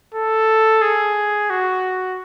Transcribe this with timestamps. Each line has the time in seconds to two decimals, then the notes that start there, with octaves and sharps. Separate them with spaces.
0.14 A4
0.82 G#4
1.50 F#4